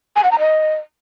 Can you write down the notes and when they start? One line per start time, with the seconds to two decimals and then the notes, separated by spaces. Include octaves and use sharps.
0.16 G#5
0.24 F#5
0.31 A#5
0.39 D#5